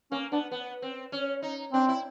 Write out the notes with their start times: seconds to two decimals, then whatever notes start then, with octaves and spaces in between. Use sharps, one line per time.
0.11 A#3 C#4
0.32 B3 D4
0.51 B3
0.82 C4
1.12 C#4
1.42 D#4
1.73 C4 D4
1.88 E4